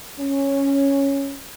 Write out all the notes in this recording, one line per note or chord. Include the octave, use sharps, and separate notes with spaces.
C#4